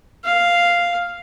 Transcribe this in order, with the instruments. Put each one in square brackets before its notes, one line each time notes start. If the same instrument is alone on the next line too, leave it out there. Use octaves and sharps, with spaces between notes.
[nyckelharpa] F5